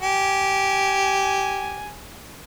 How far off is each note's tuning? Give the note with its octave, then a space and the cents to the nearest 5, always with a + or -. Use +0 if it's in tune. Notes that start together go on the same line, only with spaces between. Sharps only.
G4 -10 G#5 +0